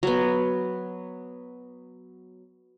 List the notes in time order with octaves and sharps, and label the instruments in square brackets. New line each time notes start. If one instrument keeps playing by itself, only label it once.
[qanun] F#3 B3